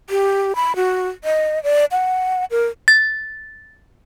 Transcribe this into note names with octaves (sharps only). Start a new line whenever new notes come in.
G4
B5
F#4
D#5
D5
F#5
A#4
A6